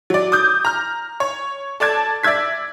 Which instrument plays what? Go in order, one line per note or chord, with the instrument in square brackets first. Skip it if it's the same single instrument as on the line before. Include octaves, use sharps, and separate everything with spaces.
[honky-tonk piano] F#3 D5
D6 D#6 G6
A#5 F6
C#5
A4 D5 A5 G#6
D5 E5 E6 G#6 B6